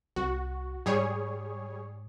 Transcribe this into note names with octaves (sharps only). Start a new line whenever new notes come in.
C2 F#4
G#2 G3 G#4 C#5